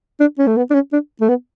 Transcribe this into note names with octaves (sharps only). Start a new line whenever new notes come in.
D4
C#4
A3
B3
D4
C#4
D4
A3
B3